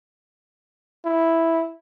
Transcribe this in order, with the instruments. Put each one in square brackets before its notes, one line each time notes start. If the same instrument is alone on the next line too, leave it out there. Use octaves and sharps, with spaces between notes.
[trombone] E4